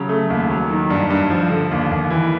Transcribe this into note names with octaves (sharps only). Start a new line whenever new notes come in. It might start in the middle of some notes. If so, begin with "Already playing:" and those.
Already playing: C#3 F#3
A3
D#2
F#3
D#3
G2
G2
F3
D3
D#2
D#2
E3